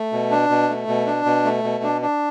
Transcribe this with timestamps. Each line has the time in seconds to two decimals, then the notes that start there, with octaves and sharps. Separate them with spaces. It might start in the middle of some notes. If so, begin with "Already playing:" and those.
Already playing: A3
0.12 B2
0.31 D4
0.50 B2
0.69 A3
0.88 B2
1.07 D4
1.25 B2
1.45 A3
1.64 B2
1.84 D4
2.02 D4